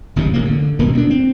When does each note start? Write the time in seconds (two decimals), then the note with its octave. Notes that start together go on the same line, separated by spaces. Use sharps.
0.16 F#1 D#2 G#2 C3
0.34 A1 C3 A#3
0.45 D3
0.79 D#1 G2 B2 A#3
0.93 D2 B3 D4
1.10 C4